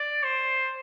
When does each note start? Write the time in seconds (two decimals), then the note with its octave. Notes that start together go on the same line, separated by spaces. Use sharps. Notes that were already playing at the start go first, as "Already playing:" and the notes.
Already playing: D5
0.24 C5